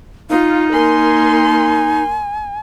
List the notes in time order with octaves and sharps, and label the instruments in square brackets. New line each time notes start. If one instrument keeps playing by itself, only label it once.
[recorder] D#4 [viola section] F4 [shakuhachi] F5
[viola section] A#3 A#4 C6 [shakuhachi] G#5